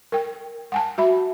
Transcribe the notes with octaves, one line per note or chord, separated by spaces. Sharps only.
A#4 G5
F#5 G#5 A5
F#4 E5 B5